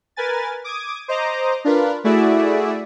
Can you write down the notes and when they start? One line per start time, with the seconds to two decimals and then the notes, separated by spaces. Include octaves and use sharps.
0.16 A#4 B4 G#5 A6
0.64 D6 D#6 G#6
1.08 C5 D#5 A#5 D6
1.65 D4 F4 A#4 B4
2.04 A3 E4 F#4 G#4 D5 E5